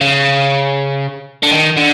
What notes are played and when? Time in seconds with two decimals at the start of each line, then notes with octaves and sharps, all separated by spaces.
0.01 C#3
1.43 D3
1.52 D#3
1.77 D3